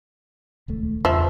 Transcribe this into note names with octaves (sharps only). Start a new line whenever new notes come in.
D#1 C#2 A3
E2 F3 E5